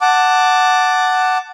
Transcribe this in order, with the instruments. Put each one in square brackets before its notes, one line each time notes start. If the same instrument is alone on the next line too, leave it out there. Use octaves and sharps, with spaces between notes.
[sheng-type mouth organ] F#5 A5 D6